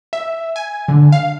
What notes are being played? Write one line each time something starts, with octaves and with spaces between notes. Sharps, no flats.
E5
G#5
D3
F5